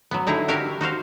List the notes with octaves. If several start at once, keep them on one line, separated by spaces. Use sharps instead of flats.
F#3 B3
D3 D#4 E4 G#4 A#5
F#4 G4 A#4 E5 F5
D#4 F#4 C5 F5